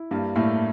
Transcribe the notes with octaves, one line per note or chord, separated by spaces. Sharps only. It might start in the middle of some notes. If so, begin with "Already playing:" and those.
Already playing: E4
G2 G3 A#3
A2 A3 A#3